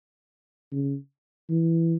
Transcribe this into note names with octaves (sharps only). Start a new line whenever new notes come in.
C#3
E3